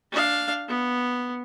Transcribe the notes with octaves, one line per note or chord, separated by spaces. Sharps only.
D4 F5
B3